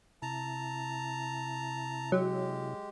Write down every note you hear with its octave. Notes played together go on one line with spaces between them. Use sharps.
C3 E4 A5 A#5
F#3 G#3 G4